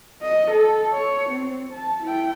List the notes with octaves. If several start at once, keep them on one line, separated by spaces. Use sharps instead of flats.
D#5
A4
C#5
C4
A5
E4 G5